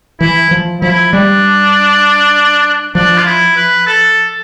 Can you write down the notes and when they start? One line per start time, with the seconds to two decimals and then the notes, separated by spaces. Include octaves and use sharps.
0.21 E3 E4
0.51 F3
0.82 F3 E4
1.13 G3 D4
2.95 F3 D4
3.18 F4
3.25 E4
3.56 B4
3.87 A4